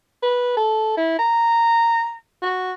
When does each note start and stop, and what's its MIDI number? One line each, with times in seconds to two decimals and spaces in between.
0.23 0.55 71
0.57 0.92 69
0.97 1.19 64
1.19 2.16 82
2.42 2.72 66